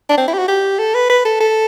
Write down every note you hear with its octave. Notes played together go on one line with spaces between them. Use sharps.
D4
C4
E4
G4
F#4
G4
A4
B4
B4
A4
A4